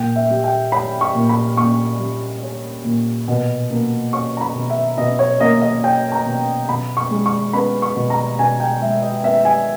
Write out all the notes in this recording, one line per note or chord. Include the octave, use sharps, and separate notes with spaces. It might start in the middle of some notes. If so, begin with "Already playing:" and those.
Already playing: A#2 G5
E5
G3
G5
C#4 B5
C#6
A#2
B5
A#2 C#6
G3
C#4
A#2
B2
A#3
C#4 C#6
A#5
B5
B2
E5
B2 D#5
C#5
A#3 D#5
D#5
C#4 G5
A#5
B2
B2 B5
C#6
G#3
C#6
B3 B5
C#6
B2
A#5
B2 G#5
G5
G#3 E5
D#5
B3 E5
G#5